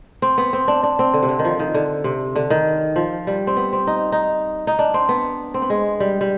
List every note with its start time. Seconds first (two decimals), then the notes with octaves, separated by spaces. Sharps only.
0.22 C4
0.38 B3
0.53 C4
0.68 D4
0.83 D4
0.99 C4
1.14 D3
1.23 C3
1.29 D3
1.39 D#3
1.45 F3
1.59 D#3
1.74 D3
2.04 C3
2.36 D3
2.50 D#3
2.96 F3
3.27 G3
3.47 C4
3.57 B3
3.73 C4
3.87 D#4
4.12 D#4
4.67 D#4
4.79 D4
4.94 C4
5.09 B3
5.54 C4
5.62 B3
5.70 G#3
6.00 G3
6.21 G3